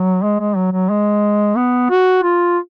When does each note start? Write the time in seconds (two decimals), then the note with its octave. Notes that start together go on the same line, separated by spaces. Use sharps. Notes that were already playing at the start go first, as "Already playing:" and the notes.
Already playing: F#3
0.23 G#3
0.39 G#3
0.56 F#3
0.72 F#3
0.89 G#3
1.57 B3
1.90 F#4
2.23 F4